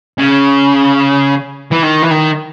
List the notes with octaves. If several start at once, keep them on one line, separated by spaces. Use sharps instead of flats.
C#3
E3
D#3
E3
D#3